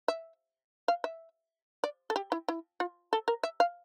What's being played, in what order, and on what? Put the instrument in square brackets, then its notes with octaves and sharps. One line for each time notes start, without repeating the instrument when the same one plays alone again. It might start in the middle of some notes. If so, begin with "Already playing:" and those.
[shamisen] E5
F5
E5
D5
A4
G4
E4
E4
F4
A4
A#4
E5
F5